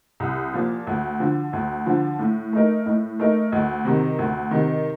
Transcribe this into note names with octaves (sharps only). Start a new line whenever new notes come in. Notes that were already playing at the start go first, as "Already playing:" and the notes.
C2
A#2 F3
D2
D3 F3
D2
D3 F3
A2
A3 D#4 A#4
A2
A3 D#4 A#4
D2
C3 D#3
D2
C3 D#3